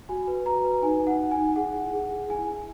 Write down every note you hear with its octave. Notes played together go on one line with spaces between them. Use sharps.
F#4 G#5
B4
F#4 A#5
B4
D#4 G#5
D#4
F#5
D#4
G#5
D#4
G#4 F#5
E4
G#4
G#4
E4 G#5
E4